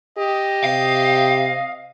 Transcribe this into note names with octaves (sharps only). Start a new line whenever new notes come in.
G4 D#5
C3 F5